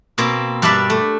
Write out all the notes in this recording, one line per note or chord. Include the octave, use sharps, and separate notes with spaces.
B2 A#3 C4
G2 G3 D4 D5 E5 B5
A3